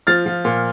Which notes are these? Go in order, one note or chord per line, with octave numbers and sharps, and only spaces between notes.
F3 F6 A6
F3
A#2